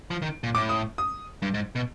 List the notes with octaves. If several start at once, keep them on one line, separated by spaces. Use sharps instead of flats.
F3
D#3
A#2
A2 D6
D#6
D#6
G2
G#2
B2